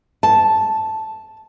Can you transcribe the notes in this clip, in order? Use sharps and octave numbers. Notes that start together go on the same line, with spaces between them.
A5